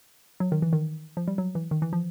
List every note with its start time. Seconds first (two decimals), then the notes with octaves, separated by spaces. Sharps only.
0.40 F#3
0.52 D#3
0.62 E3
0.73 D#3
1.17 F3
1.28 G3
1.38 F#3
1.55 E3
1.71 D#3
1.82 E3
1.93 F3